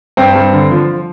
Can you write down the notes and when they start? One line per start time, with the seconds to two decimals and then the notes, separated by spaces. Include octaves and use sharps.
0.17 G2 C4
0.36 G2
0.53 D3
0.71 F3